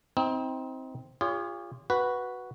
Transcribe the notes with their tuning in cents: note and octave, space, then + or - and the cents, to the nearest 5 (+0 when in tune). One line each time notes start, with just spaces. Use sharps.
C4 +0 D#4 +35
F4 -5 G#4 -40 C#5 +30
F#4 +0 B4 -5